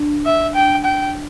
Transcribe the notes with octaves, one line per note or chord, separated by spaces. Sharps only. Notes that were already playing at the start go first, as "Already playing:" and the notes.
Already playing: D4
E5
G5
G5